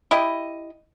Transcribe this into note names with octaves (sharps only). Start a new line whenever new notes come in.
E4 G4 D#5